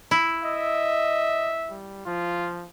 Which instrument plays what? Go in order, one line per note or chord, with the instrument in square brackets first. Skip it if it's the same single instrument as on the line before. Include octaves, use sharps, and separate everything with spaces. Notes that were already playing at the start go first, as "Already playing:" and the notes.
[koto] E4
[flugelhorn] D#5 [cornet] E5
[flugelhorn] G3
[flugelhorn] F3 [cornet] F4